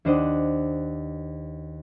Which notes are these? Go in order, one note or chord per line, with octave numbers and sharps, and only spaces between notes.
D#2 D4 C5 D#5 F#5